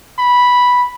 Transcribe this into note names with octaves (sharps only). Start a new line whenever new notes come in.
B5